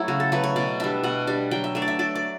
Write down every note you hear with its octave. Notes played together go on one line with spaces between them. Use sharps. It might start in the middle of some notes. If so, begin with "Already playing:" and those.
Already playing: F#3 A3 E4
C#3 F#4
A4
F#3 A3 B4
C#5
B2 D5
G3 D4 E5
B2 F#5
G3 D4
F#3 G5
E5
A3 D4 E5
D5
E5
F#3 D5
D5